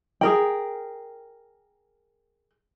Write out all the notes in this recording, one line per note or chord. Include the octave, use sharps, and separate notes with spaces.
G#4 A#4 G5